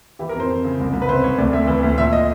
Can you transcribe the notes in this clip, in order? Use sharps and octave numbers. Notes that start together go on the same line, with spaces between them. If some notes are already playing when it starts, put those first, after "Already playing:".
E3 G4
A#4
F2 C5
F2
C#3
C2
C2
B4
C3 C5
C2 C#5
D2 D5
D2 E5
E3
D2
A#2 E5
D#5